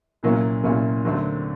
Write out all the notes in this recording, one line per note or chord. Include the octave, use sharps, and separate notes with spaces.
C2 A#2 F#3 A#3 C#4
C2 A#2 F#3 A#3 C#4
D#2 D3 F#3 A3 C4